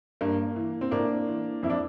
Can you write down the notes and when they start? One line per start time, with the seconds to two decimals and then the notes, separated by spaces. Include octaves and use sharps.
0.21 G2 A#3
0.56 E3
0.81 C4
0.91 A2 A#3 D4
1.28 E3
1.63 F2 E4
1.70 D4